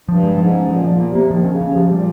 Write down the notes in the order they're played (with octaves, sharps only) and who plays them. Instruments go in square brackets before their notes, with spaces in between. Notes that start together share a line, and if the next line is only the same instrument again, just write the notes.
[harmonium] G2 [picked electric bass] F3
[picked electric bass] G#3
[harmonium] G#2 [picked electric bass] F3
[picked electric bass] C#4
[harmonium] A#2 [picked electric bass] F3
[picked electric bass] F3
[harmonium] A#2
[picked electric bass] A#3
[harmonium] C3
[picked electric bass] A#3
[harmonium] D#3 [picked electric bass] F3
[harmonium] D#3 [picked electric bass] C#4
[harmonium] C#3
[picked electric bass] C#4
[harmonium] C3
[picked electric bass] F3
[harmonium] C3
[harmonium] A#2 [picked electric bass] G3